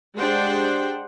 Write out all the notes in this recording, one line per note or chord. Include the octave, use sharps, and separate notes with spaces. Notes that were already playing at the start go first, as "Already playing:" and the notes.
G#3 D4 G4 C5 F#5 G5